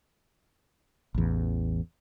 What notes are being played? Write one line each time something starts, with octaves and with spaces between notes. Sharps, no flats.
A1 E2